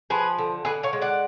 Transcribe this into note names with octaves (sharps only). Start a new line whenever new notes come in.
F3 G#4 B4
D3
D3 G#4 B4
C#5 F5
G#3
D5 F#5